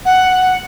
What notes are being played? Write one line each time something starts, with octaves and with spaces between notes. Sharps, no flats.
F#5